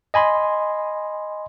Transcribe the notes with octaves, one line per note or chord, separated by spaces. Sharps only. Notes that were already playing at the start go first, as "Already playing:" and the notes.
D#5 G#5 B5 C6